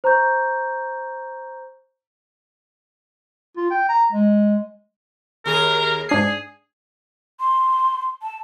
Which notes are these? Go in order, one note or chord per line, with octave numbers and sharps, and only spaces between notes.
C5 A#5 C#6 G6
F4
G5
A#5
G#3
D#2 G#4 A#4
G#2 D4 G#4 C7
C6
A5